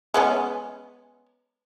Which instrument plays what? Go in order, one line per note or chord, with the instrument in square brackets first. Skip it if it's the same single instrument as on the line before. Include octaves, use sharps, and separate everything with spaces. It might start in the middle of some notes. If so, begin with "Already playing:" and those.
[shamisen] G#3 B3 C#4